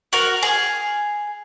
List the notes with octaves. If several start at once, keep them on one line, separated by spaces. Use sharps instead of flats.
F#4 A#4
G#4